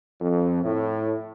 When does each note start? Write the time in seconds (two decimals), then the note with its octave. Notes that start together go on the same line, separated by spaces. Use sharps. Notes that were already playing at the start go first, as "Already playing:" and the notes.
0.21 F2
0.63 A2